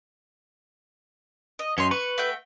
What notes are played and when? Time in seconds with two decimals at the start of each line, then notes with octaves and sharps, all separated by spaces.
1.59 D#5
1.78 F#2 C#5 D#5 C6
1.91 B4 C#6
2.18 A3 F#4 G5